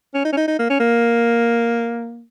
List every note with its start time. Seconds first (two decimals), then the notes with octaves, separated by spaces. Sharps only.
0.14 C#4
0.25 D#4
0.33 C#4
0.37 D#4
0.48 D#4
0.59 A#3
0.70 C#4
0.80 A#3